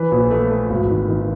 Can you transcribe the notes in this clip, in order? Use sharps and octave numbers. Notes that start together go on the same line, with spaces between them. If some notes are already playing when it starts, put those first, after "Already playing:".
Already playing: E3 B4
A#1
A3
A3
G#1
D#3
D#3